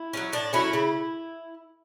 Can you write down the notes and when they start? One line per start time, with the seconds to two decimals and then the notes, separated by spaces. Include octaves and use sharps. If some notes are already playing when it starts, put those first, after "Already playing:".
Already playing: E4
0.13 F#3 A3 C#4
0.33 A2 D4
0.53 F#3 A3 C#4 E4
0.73 C#3